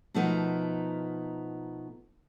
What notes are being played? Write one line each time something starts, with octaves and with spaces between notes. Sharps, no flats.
B2 F3 A3 B3 D#4 A#4